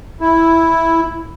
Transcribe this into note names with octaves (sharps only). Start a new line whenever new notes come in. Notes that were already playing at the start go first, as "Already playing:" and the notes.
E4